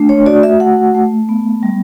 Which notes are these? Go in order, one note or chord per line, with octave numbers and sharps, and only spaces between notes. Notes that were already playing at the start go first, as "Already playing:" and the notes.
Already playing: A3 D4
C#5
F#4 D5
E5
A3 F#5
A3
B3
G3